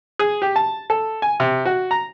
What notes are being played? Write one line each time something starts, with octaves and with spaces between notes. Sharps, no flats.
G#4
G4
A5
A4
G#5
C3
F#4
A#5